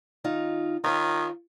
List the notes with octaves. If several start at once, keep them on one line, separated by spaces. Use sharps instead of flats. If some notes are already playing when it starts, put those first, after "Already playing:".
D#3 D#4 F4
D#3 F4 C#5